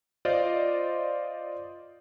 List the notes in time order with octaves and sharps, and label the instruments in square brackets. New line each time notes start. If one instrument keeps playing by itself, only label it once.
[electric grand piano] F4 C5 D5 D#5